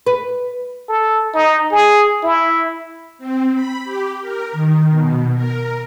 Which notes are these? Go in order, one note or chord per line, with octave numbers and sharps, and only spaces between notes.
B4
A4
D#4
G#4
E4
C4
B5
G4
A#4
D#3
B2
A#4